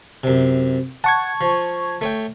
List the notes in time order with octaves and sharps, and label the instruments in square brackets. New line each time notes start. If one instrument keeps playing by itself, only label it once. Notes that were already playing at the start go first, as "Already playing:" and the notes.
[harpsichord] F#2 C3
[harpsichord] F#5 [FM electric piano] A5 C#6 G#6
[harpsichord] F3
A3 C#5 G5